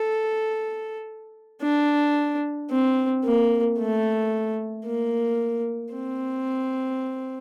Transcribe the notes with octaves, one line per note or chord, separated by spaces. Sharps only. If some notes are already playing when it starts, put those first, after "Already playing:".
Already playing: A4
D4
C4
A#3
A3
A#3
C4